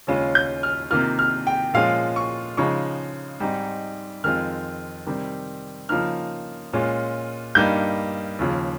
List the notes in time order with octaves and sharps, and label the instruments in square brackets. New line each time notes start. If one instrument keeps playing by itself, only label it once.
[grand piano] D#2 C#3 G#3 C#4 F4
G6
F6
C3 D#3 A#3 F4 F6
F6
G5
A#2 F3 G#3 C#4 F4 F5
C#6
C#3 F3 G#3 D#4 C#6
G#2 G3 C4 D#4
F2 D#3 G#3 C4 F4 F6
C3 D#3 G3 C4
C#3 F3 A#3 D#4 F6
A#2 G#3 C#4 F4
G2 G3 A#3 D#4 G6
D#2 C#3 F3